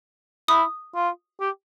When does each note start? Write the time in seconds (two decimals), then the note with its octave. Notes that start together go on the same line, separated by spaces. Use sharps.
0.48 E4 D#6
0.95 F4
1.41 G4